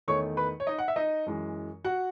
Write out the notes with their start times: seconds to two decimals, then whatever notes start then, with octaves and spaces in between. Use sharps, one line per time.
0.08 E2 D#3 A3 C#5 C#6
0.37 B4 B5
0.60 C#5
0.67 D#4 D#5
0.78 F#5
0.88 E5
0.96 D#4 D#5
1.26 F#2 E3 G#3
1.85 F#4 F#5